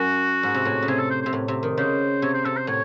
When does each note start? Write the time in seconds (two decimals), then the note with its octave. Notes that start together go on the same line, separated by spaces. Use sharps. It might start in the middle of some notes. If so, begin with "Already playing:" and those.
Already playing: F#2 F#4
0.43 G#2
0.54 C3
0.65 A2
0.82 C#3
0.88 C3 G#4
0.99 A4
1.10 C5
1.21 C3 C5
1.33 A2
1.48 C3
1.63 D#3
1.77 C#3 C5
2.22 C3 C#5
2.34 C5
2.45 C3 A4
2.56 C5
2.67 A2 C#5